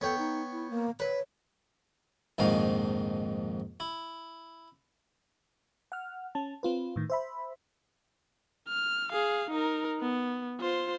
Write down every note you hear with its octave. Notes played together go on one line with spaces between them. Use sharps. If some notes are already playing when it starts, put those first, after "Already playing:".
B3 A4 C#5 G5
D#4
E4
A#3
B4 C#5
A#1 F2 G#2 D#3 F3 F5
E4
F#5 F6
C#4 A5
C4 F4 B4
A2 D#3
C5 E5 B5
F6
G#4 F5
D#4 A#4
B3
F4 C5